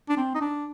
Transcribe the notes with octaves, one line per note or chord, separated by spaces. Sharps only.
D4
C4
D#4
D4